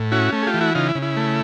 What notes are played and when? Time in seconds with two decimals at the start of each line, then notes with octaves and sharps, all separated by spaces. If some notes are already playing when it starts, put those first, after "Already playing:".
Already playing: A2
0.12 C#4 E4 F#4
0.33 A3
0.43 G#4
0.47 F4 G4
0.54 E3
0.61 E4 F#4
0.75 C#3 D#4 F4
0.89 E4
0.95 C#3
1.02 E4
1.17 A3